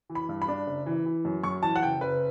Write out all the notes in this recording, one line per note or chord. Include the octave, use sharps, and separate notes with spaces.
E3
B5
G2
B5
D4
F#1
E3
E3
F#2
F#2 C#6
E3 A5
F#5
F#1 G5
F#1 B4